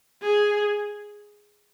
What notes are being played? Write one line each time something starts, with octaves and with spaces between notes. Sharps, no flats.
G#4